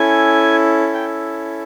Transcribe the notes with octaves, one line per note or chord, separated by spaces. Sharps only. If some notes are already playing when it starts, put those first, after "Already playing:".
Already playing: C#4 E4 A4 G#5
G5